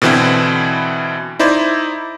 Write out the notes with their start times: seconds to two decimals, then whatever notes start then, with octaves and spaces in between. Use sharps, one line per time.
0.02 B2 D3 E3 C4 E4
1.39 D#4 E4 C5 D5